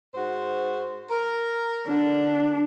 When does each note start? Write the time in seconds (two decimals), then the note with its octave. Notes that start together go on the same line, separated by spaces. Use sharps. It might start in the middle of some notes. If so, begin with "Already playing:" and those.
0.15 G#2 F#4 C5
1.10 A#4
1.88 D3 D4